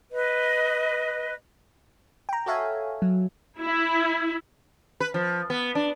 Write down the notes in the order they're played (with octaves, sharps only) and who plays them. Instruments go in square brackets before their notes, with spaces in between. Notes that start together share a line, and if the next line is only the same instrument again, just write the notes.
[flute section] B4 D#5
[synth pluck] G5 A#5
F#4 A4 C#5 E5 F5 G#5
F#3
[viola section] E4
[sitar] B4
F3
B3
D4